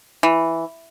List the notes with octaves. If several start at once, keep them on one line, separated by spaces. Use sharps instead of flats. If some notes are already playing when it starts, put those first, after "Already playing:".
E3